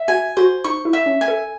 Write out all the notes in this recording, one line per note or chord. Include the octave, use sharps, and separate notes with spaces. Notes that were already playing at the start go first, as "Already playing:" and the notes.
Already playing: E5
F#4 G#5
F#4 C5
D#4 C#6
E4
E5
C#4
G#5
A4